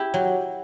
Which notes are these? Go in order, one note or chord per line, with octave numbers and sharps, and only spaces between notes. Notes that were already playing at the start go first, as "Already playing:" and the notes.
Already playing: E4 G4
F#3